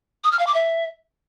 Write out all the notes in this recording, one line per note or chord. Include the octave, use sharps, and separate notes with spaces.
D#6
F6
F5
D6
E5